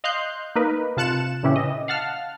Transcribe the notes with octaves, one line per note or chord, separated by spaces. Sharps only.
D#5 F5 C6 F#6 G6
A#3 D#4 A#4 B4
C3 F4 A5 F#6 C#7 E7
A#2 C#3 E3 C#4 E4 G4
D#5
F5 F#5 A5 F6